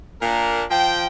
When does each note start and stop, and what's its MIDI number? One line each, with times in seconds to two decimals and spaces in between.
0.21 0.64 46
0.21 0.64 58
0.21 0.64 62
0.21 0.64 70
0.70 1.07 53
0.70 1.07 79